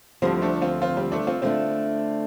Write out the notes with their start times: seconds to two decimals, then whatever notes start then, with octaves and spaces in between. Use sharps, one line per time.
0.22 D2 D3 F3 G3 C4
0.42 A3 D4
0.62 C4 F4
0.82 C4 F4
0.97 G3 C4
1.12 A3 D4
1.27 C4 F4
1.42 D3 A3 C4 D4 F4